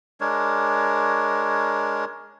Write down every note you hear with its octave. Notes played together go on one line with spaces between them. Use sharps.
G#3 D4 A#4 C#5